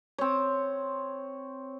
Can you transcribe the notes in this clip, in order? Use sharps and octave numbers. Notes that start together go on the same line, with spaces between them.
C4 C#5